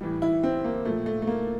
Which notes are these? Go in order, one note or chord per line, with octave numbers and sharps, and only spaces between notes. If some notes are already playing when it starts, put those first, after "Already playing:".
A2 E3 G3
E4
C4
A#3
A#2 F3 A3
A3
A3
A#3